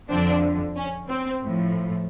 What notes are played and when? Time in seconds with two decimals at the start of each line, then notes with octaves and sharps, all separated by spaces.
0.10 F2 D3 F3 C4 D4
0.76 C#4
1.09 C4
1.42 A2 F3